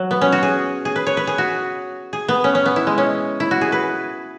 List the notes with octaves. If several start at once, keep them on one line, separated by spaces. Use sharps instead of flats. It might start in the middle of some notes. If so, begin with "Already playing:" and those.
Already playing: F#3
B3
C#4
F#4
G#4
G#4
B4
C#5
B4
G#4
F#4
G#4
B3
C#4
C#4
B3
E4
G#3
C#4
E4
F#4
G#4
B4